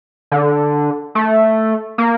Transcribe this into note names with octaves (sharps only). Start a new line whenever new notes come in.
D3
A3
A#3